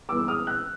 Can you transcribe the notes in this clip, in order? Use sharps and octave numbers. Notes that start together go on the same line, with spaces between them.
G2 E3 G#3 B3 D6 E6
D#6 F6
E6 F#6